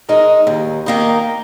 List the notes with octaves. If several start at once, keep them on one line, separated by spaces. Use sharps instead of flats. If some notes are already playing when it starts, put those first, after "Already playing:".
G#3 D#4 A#4
D#2
D#3 A#3 D#4